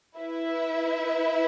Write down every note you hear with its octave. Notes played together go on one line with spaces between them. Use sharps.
E4 B4 E5